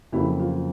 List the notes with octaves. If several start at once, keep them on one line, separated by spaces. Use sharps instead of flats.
F2 C#3 F#3 A#3 E4
F4